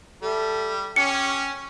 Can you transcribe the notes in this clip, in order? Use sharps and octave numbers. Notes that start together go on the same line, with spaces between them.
G3 A4 E5
C#4 G4 F6 C#7